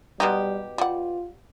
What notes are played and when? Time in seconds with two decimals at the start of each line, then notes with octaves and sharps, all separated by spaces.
0.20 B2 G3 G#3 D#4 G4
0.78 G3 F4 F#5